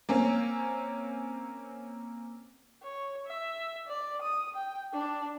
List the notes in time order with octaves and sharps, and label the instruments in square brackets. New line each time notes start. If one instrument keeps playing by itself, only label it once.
[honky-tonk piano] A#3 C4 C#4
[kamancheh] C#5
E5
D5
D#6
G5
D4